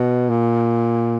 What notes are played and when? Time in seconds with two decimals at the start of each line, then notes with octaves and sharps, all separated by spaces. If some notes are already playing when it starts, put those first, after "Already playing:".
Already playing: B2
0.29 A#2